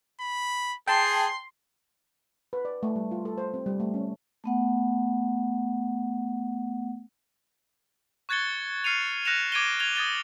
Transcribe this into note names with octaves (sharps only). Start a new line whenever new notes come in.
B5
G#4 G5 A5 C6
B4
D5
A3
G3
F4
A4
C5
C4
G3
A3
C#4
A3 B3 F#5
C#6 F#6 G#6 A6 C#7 G7
F6 C7 C#7 D#7 F7
F6 F#6 A#6 C#7 E7 F7
D6 G#6 D7 D#7 F7 G7
G#6 F7 G7
D#6 G#6 A6 G7